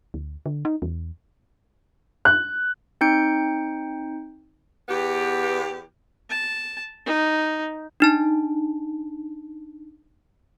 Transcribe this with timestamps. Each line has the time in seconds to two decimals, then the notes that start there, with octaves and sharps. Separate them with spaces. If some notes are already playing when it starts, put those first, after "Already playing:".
0.14 D2
0.46 D3
0.65 D#4
0.82 E2
2.25 F#6
3.01 C4 D#4 G6 C#7 D7
4.89 E2 B3 G4
6.30 A5
7.06 D#4
8.00 D4 D#4 A5